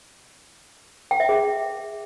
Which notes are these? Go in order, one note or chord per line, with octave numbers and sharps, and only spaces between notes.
G5
E5
G#4